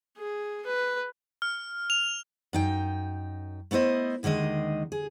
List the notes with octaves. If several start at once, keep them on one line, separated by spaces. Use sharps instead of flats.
G#4
B4
F6
F7
F#2 D#4 G5
A3 B3 E4 C5 D#5
D#2 D3 D#3 G#3 D#5
G#4